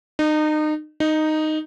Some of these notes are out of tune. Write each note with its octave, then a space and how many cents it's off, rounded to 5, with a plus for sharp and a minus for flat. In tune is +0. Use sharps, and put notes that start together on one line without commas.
D#4 -30
D#4 -5